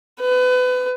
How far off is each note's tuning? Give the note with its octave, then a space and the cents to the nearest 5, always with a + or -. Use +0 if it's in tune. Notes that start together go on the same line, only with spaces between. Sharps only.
B4 +30